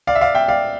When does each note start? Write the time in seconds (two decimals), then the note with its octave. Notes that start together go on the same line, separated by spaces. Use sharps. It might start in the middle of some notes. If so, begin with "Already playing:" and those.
0.07 D5 F5
0.15 E5
0.21 D5 F5
0.35 E5 G5
0.48 D5 F5